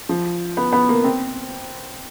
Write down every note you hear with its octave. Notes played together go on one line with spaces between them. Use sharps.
F3
B3
B3
A#3
C4